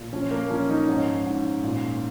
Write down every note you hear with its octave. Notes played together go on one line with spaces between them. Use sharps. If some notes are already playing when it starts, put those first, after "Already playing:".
Already playing: A#2
F3 C#4
A#3
F3 C#4
D#4
G#2 C#4
G#2
A#2